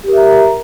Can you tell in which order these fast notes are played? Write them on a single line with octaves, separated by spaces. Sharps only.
G4 A#4 E5 A#5